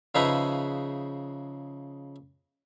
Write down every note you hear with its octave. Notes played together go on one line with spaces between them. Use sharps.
C#3 F3 D#4 G#4 B4 E5